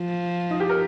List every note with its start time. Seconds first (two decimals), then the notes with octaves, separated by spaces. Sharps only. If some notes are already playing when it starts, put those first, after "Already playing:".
Already playing: F3
0.51 D#4
0.60 G4
0.69 A#4